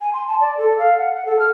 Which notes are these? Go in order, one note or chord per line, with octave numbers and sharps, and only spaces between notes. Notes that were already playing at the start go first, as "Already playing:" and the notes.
G#5
C6
A5
D5
A4
F5
F#5
F#5
A4
F6